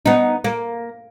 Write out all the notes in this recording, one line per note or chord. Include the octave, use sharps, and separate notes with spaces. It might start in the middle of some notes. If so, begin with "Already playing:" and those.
B3 D#4
A#3